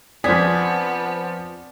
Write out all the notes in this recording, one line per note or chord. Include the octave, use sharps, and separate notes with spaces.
F3 B3 C4 G#4 D5 B6